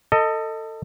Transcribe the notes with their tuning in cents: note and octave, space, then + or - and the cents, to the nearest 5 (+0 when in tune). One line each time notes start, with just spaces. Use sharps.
A4 +25 D#5 +0